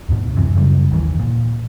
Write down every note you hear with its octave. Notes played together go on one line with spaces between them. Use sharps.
D2 G#2 B2
F#2 C3 E3
F#2 C#3 G3
G#1 D#2 E3
A#2